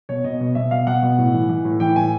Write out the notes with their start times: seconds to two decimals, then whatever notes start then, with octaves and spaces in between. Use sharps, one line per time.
0.09 B2 C#5
0.24 B2 D#5
0.41 B2
0.55 B2 E5
0.71 B2 F5
0.87 B2 F#5
1.02 B2
1.18 A2
1.34 E3
1.49 E3
1.65 A2
1.80 E3 G5
1.96 A2 G#5